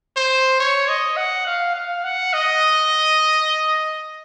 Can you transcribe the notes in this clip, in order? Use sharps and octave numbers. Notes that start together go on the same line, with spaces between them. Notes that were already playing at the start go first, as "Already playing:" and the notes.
C5
C#5
D#5
F#5
F5
F5
F#5
D#5